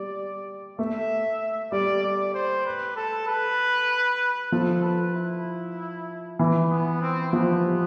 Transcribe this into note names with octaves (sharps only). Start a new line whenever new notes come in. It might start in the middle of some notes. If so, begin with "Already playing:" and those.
Already playing: G3 D5
A3 E5
G3 D5
D5
C5
B4
A4
B4
F3 A4
B4
E4
E3
B3
C4
F3 B3
G3